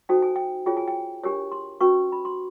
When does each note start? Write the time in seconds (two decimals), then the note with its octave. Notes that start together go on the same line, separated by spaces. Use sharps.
0.09 D#4 F#4 A4 C5 G5
0.22 G#5
0.36 G5
0.66 F4 G#4 C#5 G5
0.77 G#5
0.88 G5
1.23 D4 G4 A#4 C#5 G#5
1.52 C6
1.81 C#4 F#4 B4 C#6
2.12 B5
2.25 C6